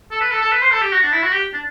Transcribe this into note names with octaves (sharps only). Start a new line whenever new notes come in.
A4
B4
A4
A4
B4
C5
A4
G4
F#4
D4
E4
F#4
G4
D4